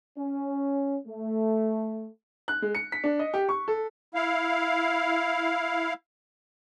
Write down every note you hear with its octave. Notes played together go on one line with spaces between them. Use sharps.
C#4
A3
F#6
G#3
C#7
B6
D4
D#5
G4
C#6
A4
E4 F5